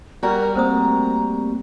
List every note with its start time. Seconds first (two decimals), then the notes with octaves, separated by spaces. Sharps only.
0.23 G3 F#4 A#4 D5 A#5
0.55 A3 A#3 C4 A#4 C5 A#5 D#6